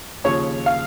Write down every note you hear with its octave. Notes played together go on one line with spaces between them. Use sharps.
D#2 C#3 F3 C#5
F5